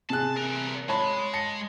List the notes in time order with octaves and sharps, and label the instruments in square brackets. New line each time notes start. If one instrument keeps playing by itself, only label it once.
[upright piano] C3 G#4 F#6 [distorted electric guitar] A5
[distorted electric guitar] E2 A#4
[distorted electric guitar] G#3 [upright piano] C#5 A5 B5
[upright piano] A5 A#6 C#7